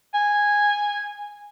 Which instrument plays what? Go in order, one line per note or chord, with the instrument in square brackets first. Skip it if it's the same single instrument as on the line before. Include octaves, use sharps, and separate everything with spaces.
[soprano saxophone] G#5